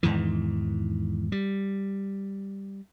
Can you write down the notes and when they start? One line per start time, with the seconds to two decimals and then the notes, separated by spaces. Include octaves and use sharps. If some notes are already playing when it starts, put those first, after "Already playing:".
0.03 E2 G#2 D#3 E3
1.32 G3